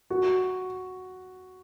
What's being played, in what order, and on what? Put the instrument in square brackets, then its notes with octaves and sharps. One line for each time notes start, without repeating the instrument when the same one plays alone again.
[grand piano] F#4